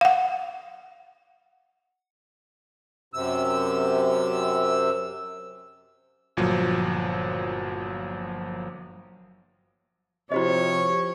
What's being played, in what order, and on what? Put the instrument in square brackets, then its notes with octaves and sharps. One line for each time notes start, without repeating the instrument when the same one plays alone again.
[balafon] F5 F#5
[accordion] F#2 C3 E6
[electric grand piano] G1 A#2 F3 F#3
[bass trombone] C3 [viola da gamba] F3 [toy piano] E4 F#4 D#5 [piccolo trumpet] C#5